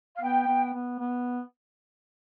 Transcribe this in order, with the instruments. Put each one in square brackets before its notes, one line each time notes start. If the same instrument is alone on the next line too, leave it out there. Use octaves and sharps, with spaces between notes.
[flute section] F5
[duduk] B3 [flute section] G5
[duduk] B3
B3
B3